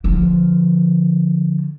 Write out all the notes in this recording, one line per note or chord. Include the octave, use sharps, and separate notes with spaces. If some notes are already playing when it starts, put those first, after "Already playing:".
D3 F3